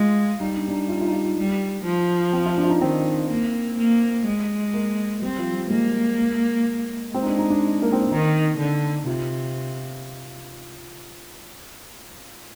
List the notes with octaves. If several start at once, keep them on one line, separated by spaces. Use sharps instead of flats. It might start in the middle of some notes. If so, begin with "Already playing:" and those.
Already playing: G#3 F4
G3 D#4
D4
D4
D#4
F4
D#4
F4
D#4
F4
F4
G3
F3
C4
F4
D4
F4
D#4
D#3 C4
A#3
A#3
G#3
A#3
G3 C4
F3
G3
G#3 A#3
G#3 C4
D#4
D4
D#4
D4
A#3
C4
D4
D#3 D#4
D3
C3 F4